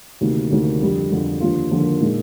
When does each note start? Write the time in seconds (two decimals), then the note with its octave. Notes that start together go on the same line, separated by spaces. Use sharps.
0.21 D2 C3 D#3 A#3
0.51 D2 C3 D#3 A#3
0.81 F2 D3 G3
1.11 F2 D3 G3
1.41 D#2 D3 F3 A#3 F4
1.71 D#2 D3 F3 A#3 F4
2.01 A#2 G#3 D#4